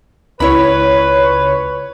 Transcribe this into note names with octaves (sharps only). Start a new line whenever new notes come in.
C#2 E4 B4 C#5 B5